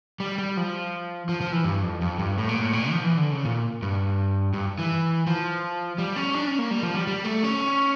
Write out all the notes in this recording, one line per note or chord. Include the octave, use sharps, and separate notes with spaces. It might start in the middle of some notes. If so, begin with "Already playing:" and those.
G3
G3
F3
F3
F3
E3
G2
F2
F2
G2
A2
A#2
A2
A#2
F3
E3
D3
C#3
A#2
G2
G2
E3
F3
G3
C#4
D4
C#4
A#3
G3
F3
G3
G3
A3
C#4